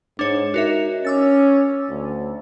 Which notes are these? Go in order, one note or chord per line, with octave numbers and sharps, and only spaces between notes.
G#2 D4 C#5
D#4 F#4 A#4 E5
C#4 D6 E6 A6
D2